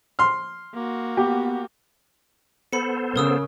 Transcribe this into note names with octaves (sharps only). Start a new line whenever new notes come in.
C6 F6
A#3 F#4
B3 G4
B3 A4 C5 B5 C#7
C#3 A#4 D#6 E6